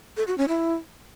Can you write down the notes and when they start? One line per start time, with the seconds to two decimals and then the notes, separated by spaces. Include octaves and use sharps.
0.17 A4
0.27 F#4
0.38 C#4
0.48 E4